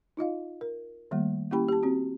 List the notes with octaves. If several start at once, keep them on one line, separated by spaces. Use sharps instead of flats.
D#4 F4 D#5 F5
A#4
D#3 G3 A3 A#3
A#3 C#4 E4 G4 G5 B5
G4 A5
C4 F#4